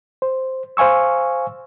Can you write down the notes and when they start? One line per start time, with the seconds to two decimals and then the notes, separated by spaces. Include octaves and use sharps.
0.22 C5
0.77 C5 F5 G#5 C#6 E6